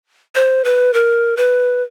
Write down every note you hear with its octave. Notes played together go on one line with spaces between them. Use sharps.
C5
B4
A#4
B4